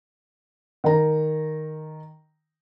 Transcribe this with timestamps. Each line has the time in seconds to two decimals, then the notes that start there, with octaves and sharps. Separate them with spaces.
0.84 D#3 A#5